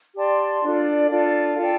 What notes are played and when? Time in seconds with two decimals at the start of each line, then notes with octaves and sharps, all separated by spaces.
0.15 G4 D5 A5 C6
0.64 D4 F4 A4 D5
1.10 D4 F4 A4 D5
1.58 F4 A4 D5 G5